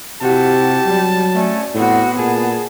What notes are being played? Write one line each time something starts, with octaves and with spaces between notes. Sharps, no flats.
C3 E4 F#4 G4 A5
F#3 G3
A3 C#4 D5
A2 B3 C4 F#4
A#2 G#4 A5